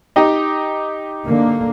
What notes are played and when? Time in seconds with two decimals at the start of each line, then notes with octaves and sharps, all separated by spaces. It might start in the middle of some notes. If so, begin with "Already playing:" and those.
0.16 D#4 G4 D#5
1.26 D3 A#3